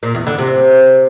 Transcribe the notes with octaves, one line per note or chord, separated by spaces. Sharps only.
A#2
E2
D3
C3